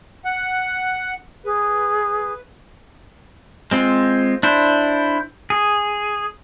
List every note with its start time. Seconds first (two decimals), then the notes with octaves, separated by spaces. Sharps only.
0.25 F#5
1.45 G#4 B4
3.71 G#3 C4 F4
4.43 D4 E4 C5
5.50 G#4